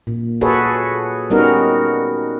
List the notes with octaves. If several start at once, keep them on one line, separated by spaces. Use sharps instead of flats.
A#2
F#4 G#4 A4 B4 C#5
G3 B3 C#4 D#4 F#4 A#4